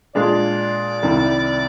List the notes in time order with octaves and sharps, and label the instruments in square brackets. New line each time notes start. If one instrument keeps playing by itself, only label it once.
[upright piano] A#2 G#3 D4 [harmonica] D5
[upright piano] C2 C3 D#3 G3